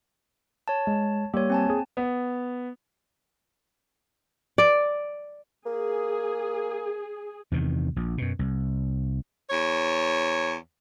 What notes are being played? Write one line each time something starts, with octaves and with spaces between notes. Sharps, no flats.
C#5 A5
G#3
G3 A#3 G4 C#5
C4 G#5 A5
G#4
B3
D5
A#3 G#4
E2 C3 D#3
A#1
F#2 B2
C2
E2 C#5